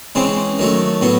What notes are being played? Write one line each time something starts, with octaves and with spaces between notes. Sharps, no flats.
C#3 E3 G#3 C4
D#3 F#3 A3
A2 F#3 B3